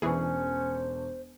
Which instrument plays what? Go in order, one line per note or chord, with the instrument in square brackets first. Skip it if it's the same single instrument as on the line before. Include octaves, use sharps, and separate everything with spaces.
[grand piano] E1 D4 C#6 [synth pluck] E3 G#4 [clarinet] C#4 [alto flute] C5